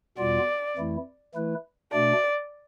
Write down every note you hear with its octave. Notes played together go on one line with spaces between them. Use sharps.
E2 B2 G3 B3 F4 D5
F2 E3 A3 E4
E3 A3 E4 B4
B2 A3 D4 D5